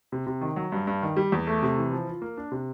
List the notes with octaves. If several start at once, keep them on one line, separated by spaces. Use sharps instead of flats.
C3
C3
D#3
F#3
G2
G2
D#3
G3
E2
A3
C3
E3
F3
F4
A#3
D4
C3